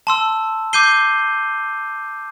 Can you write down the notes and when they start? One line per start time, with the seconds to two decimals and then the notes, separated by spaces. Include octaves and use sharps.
0.07 A5 C6 E6
0.73 D6 G6 C7 D#7 G7